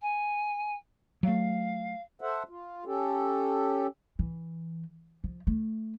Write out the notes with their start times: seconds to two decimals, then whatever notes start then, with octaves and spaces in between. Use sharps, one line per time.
0.01 G#5
1.23 F#3 A3 F5
2.21 A4 C5 E5 F#5
2.49 F4
2.86 C#4 G4 A4
4.19 E3
5.24 F3
5.47 A3